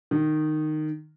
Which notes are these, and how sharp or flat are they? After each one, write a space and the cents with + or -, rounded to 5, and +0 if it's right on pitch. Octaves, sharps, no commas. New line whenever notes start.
D#3 -15